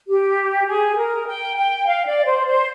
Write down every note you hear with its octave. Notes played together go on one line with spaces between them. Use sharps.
G4
G#4
A#4
G5
G5
F5
D5
C5
C5